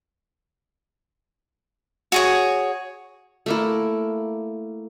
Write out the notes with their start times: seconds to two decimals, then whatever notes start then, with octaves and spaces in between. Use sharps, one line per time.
2.12 F#4 G#4 C#5
3.46 A3 A#3 E4